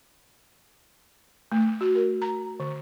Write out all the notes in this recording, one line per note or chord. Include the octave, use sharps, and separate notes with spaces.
A3
F#4
A#4
A#5
D3